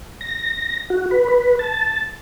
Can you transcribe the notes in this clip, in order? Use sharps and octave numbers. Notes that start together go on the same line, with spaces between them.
A#6
F#4
B4
B4
A5